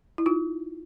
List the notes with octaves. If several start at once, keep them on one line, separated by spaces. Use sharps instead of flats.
E4
D#4 F4